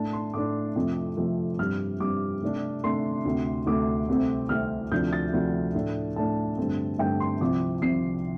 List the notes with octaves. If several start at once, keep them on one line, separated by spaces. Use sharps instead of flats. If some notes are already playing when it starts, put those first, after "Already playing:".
Already playing: A2 A3 D4 A5
C6
A2 A3 D4 D6
F2 C3 F3 A3
F2 C3 F3 A3
G2 G3 C4 F6
G2 G3 C4 D6
C3 A3 D4
C3 A3 D4 C6
D2 C3 A3
D2 C3 A3 D6
C2 C3 A3 C4
C2 C3 A3 C4 F6
D2 C3 F3 D4 G6
A6
D2 C3 F3 D4
A2 A3 D4
A2 A3 D4 A5
G2 D3 A3 C4
G2 D3 A3 C4 G5
C6
C2 C3 F3 C4 D6
C2 C3 F3 C4 C7